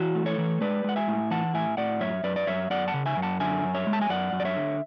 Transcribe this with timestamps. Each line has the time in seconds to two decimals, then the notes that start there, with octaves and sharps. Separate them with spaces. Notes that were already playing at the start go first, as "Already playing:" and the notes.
Already playing: E3 F#4
0.15 A3
0.26 A4 C#5
0.38 E3
0.61 G#3 B4 D5
0.84 G#3 F#5
0.96 E5 G#5
1.08 A2
1.31 E3 F#5 A5
1.54 A2 E5 G#5
1.77 A2 D5 F#5
2.01 F#2 C#5 E5
2.24 F#2 B4 D5
2.36 D5
2.47 F#2 C#5 E5
2.70 F#2 D5 F#5
2.88 F#5 A5
2.94 C#3
3.06 E5 G#5
3.17 F#2
3.22 F#5 A5
3.40 D3 E5 G#5
3.64 F#2
3.75 C#5 E5
3.87 G#3
3.93 A5
4.01 G#5
4.09 F#2 D5 F#5
4.33 F#2
4.40 D5
4.45 C#5 E5
4.57 D3